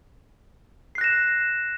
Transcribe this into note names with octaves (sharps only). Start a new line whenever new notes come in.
F#6 A#6 C7 E7